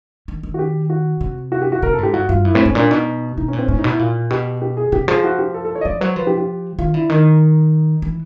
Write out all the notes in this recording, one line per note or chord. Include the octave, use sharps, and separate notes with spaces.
D#3
D#3
F#4
G4
F#4
C3
F#4
G4
F#4
C3 A#4
A4
G#2 G4
G2 F#4
G2 F4
F#2 E4
A2 C4
G#2 C#4
A#2 D4
B2 D#4
B2 D#4
C#4
A#2
C4
A2 C#4
D#4
B2
E4
A#2 F4
B2 G4
G4
G#4
C3 G4
F3 G#4
F#4
G4
A4
A4
C#5
D#5
F3 D5
F#3 C5
F3 B4
G4
G4
D#3 F4
D3 E4
D#3 D#4
E3